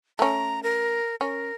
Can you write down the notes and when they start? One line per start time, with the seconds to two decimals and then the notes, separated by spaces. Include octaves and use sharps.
0.19 A3 C#4 A#5
0.63 A#4
1.21 C#4 A#4